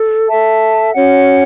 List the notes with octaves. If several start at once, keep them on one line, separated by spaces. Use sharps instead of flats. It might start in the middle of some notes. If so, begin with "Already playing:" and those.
Already playing: A4
A4 E5 A5
C#4 F#4 C#5 F#5